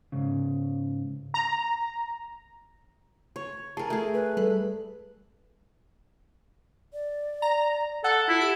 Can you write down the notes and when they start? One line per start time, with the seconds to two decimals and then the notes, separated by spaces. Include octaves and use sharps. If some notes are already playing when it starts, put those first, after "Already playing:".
0.12 G#2 C#3
1.34 A#5
3.36 C#5
3.77 G#4 A#4 A5
3.90 A3 G#4
4.14 B4
4.37 G3 A4 B5
6.93 D5
7.42 A#5
8.04 A4 F#5
8.28 E4 F4
8.41 G4 D7